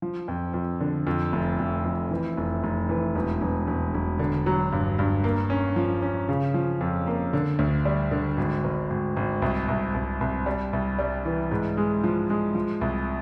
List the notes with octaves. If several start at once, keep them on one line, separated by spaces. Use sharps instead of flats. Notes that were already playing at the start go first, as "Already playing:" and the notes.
F3
F2
F2
D3
F2
F1
F1
F2
E3
F1
F1
E3
E1
E1
E1
E1
D3
F#3
G2
G2
A#3
C#4
F3
C#4
C#3
F3
F2
A#3
D3
D2
G3
D3
G#1
G#1
G#1
G#1
C2
C2
C2
C2
G3
C2
G3
E3
G#2
G#3
F3
G#3
F3
C2